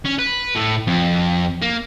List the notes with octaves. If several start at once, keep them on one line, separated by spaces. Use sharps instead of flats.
C#4
B4
A2
F2
A#3